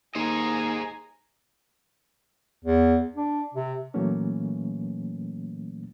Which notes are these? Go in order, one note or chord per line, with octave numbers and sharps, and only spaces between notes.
D#2 G#4 C5 D#5 G#5 A#5
E2
D4
C3
A#2 E3 F#3 A3 A#3 C#4